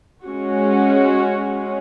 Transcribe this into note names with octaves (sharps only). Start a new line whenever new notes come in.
G#3 C#4 F#4